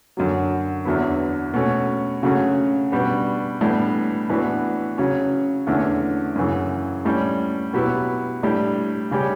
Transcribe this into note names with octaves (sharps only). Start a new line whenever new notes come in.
F#2 D3 F#3
E2 D3 F#3 B3 E4
B2 A3 C#4
C#3 F#3 A3 C#4 F#4
B2 G3 B3 D4
A2 E3 G3 B3 D4
A2 E3 B3 D4 F#4
C#3 F#3 C#4
E2 D3 A3 C#4
F#2 C#3 E3
A2 G3 C#4
B2 F#3 B3 E4 G4
A2 G3 D4 G4
C#3 G3 C#4 G4